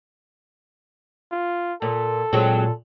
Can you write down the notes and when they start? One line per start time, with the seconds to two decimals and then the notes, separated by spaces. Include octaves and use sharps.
1.31 F4
1.82 A#2 A4
2.33 A#2 F#3 G#3 C4